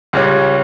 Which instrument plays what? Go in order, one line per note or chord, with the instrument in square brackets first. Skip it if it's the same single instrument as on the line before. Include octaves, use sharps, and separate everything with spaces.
[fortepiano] C#2 C#3 G3 C#4